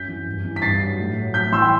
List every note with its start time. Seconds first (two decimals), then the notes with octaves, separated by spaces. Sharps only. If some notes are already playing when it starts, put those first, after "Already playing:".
Already playing: F#2 G6 B6
0.08 E3
0.26 G2
0.45 E3
0.56 B6
0.62 G2 A6 C7
0.80 F#3
0.98 A2
1.17 F#3
1.34 A2 G6 B6
1.52 E3 C6 E6
1.62 G5 B5